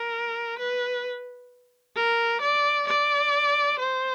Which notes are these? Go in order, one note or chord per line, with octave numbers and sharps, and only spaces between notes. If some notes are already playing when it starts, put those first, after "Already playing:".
Already playing: A#4
B4
A#4
D5
D5
C5